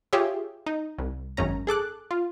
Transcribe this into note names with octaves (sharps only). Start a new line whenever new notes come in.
F4 G4 G#4 C#5 E5
D#4
C2
G#1 F#2 C#4 A#5
G#4 A4 D6 F#6
F4